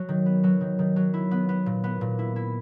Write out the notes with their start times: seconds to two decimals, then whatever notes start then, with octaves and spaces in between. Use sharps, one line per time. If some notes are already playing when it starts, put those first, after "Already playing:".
Already playing: F#3
0.09 D#3
0.26 B3
0.44 F#3
0.61 D#3
0.79 D#3
0.96 F#3
1.14 E4
1.31 B3
1.49 B3
1.66 A#2
1.84 B3
2.01 A#2
2.19 E4
2.36 E4